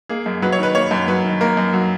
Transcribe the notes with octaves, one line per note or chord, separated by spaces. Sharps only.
A#3 G#4
F#2
F#3 B4
C#5
D#3 B4
A#3 C#5
F#2
F#3 B4
D#3
A#3 A#4
F#2
F#3